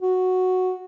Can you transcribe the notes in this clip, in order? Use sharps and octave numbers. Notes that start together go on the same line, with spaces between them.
F#4